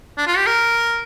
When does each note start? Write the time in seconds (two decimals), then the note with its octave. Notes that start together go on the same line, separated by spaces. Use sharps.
0.18 D4
0.27 F4
0.37 G4
0.47 A#4